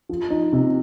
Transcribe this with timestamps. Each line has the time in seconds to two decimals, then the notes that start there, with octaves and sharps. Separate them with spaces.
0.09 F3
0.30 D#4
0.53 C3